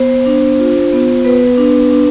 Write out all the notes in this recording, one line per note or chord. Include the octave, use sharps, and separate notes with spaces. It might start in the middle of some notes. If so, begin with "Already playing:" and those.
Already playing: B3 C5
D4
F4
B3
B3 B4
D4
D4